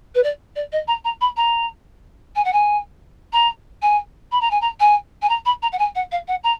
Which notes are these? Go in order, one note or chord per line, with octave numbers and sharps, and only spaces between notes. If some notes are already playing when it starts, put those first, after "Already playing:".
B4
D5
D5
D#5
A#5
A#5
B5
A#5
G#5
F#5
G#5
A#5
G#5
B5
A#5
G#5
A#5
G#5
G#5
A#5
B5
A#5
F#5
G#5
F#5
F5
F#5
A#5